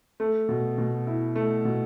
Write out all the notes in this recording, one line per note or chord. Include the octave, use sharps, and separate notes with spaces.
A3
B2
B2
E4
A3
B2